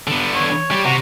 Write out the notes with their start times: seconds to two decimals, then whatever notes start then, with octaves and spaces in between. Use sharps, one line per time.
0.07 D3 B3
0.35 C#5
0.71 G3 G4
0.85 C3 F#4 A#5